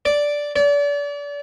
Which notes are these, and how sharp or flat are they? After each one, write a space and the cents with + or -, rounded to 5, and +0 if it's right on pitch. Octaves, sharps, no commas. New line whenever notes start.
D5 -5
D5 -35